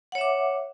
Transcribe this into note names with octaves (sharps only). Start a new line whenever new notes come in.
C#5 E5 F#5 D6